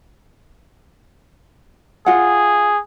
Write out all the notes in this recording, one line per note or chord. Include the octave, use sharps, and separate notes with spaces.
F4 G#4 F#5